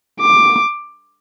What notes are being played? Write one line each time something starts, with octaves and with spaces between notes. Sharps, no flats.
D6